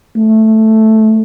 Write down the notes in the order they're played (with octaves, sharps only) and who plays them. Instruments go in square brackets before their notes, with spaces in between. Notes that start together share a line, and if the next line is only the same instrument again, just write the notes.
[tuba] A3